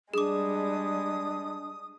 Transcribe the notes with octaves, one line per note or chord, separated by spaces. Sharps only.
G3 G#3 D4 G#4 D6 D#6